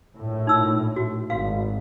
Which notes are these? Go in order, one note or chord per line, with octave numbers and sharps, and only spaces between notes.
A#1 A2
D#4 E6
F#4
G#1 F#4 F5